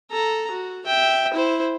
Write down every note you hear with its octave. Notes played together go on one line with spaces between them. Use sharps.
A4 A#5
F#4
E5 G5
E4 C5